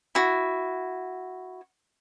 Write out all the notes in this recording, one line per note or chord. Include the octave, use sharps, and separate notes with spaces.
E4 F#4